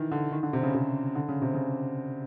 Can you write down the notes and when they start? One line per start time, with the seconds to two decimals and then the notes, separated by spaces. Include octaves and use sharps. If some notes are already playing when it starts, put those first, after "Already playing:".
Already playing: D#3 E3
0.11 D3
0.32 D#3
0.43 D3
0.53 C3
0.63 C#3
0.74 C3
1.15 D3
1.28 C#3
1.42 C3
1.54 C#3